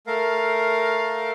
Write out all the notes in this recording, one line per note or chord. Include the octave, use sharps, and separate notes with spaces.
A3 A#4 F5